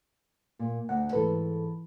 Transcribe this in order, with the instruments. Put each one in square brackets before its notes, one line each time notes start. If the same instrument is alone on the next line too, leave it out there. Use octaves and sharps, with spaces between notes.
[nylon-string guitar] A#2
[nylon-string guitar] D2 [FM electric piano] F#5
[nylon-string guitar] G#2 A4 [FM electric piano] E3 B4